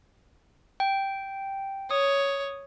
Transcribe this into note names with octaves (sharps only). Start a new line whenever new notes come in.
G5
C#5 D#6